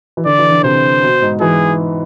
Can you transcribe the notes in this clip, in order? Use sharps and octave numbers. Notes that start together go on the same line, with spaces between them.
E3
D3 D5
E3
D3
C3 C5
B2
G#2
E3 G#4